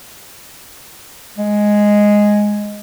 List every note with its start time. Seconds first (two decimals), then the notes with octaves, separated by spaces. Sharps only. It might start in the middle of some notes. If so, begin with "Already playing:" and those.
1.38 G#3